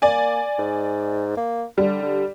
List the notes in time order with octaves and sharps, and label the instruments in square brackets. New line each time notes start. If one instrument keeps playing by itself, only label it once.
[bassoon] A#3 [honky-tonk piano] D5 G#5
[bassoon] G#2
A#3
[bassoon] D3 [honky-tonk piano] G3
[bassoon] D3